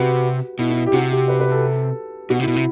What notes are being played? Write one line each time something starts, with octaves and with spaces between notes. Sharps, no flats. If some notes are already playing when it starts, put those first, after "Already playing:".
Already playing: C3 F#4 G4 B4
B2 E4
E4
G4
C3 F#4
G4
B4
B4
A4
B2 F#4
C3
E4
B2
E4
C3